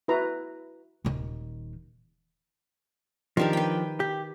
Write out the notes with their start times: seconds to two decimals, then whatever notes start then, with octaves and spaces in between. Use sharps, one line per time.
0.08 E4 F#4 B4 A#5
1.05 D#1 D#3
3.37 D#3 F3 D4 G4 A#4
3.53 B4 G5
4.00 G4